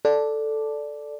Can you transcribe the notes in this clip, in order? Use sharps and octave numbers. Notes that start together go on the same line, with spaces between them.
A4 D5